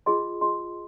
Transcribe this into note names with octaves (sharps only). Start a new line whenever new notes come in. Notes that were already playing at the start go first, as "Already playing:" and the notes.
F4 G#4 D#5 C6
F4 G#4 D#5 C6